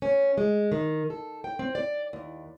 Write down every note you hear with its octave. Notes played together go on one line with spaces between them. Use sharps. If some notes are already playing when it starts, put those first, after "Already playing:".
C#4
G#3
D#3
A4
G5
C4
D5
D#2